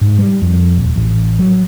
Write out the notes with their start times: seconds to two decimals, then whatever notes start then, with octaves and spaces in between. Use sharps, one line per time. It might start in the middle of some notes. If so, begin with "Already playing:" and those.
0.01 G#2
0.19 G3
0.42 F2
0.77 D#1
0.96 A1
1.39 F#3